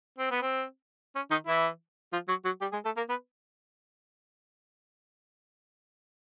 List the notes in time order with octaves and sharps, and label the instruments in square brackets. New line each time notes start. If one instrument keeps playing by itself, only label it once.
[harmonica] C4
B3
C4
C#4
D#3 D#4
E3 E4
F3 F4
F#3 F#4
F#3 F#4
G3 G4
G#3 G#4
A3 A4
A#3 A#4
B3 B4